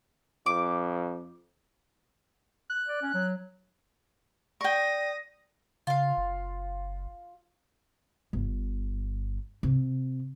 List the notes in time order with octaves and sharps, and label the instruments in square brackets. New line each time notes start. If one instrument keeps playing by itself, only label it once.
[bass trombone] F2 [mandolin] D6
[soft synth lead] F#6
[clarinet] D5
C#4
F#3
[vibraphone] D5 [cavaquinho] G5 C#6 [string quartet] D#6 A#6
[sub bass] C#3 [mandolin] F4 F5
[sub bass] F#1
[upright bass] G1
C3